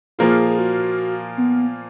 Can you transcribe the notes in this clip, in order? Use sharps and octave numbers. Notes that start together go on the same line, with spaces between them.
A#2 F3 A#3 F4 G#4
G#4
F#4
B3